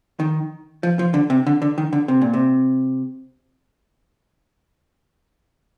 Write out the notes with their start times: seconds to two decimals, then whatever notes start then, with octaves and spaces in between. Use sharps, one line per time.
0.20 D#3
0.83 F3
0.99 F3
1.14 D3
1.30 C3
1.46 D3
1.62 D3
1.78 D#3
1.93 D3
2.08 C3
2.21 A#2
2.33 C3